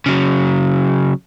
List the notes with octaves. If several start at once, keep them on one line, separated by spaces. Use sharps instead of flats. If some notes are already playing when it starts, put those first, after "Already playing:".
C#3 F#3